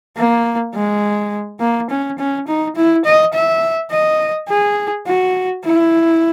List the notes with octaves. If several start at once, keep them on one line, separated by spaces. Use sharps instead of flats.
A#3
G#3
A#3
C#4
C#4
D#4
E4
D#5
E5
D#5
G#4
F#4
E4